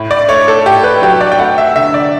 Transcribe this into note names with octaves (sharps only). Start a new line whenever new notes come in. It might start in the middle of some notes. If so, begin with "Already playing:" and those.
Already playing: A2
D5
A3 C#5
A4
A2 G4
B4
F#3 G4
D5
G5
A3 F#5
E5
D3 E5
D5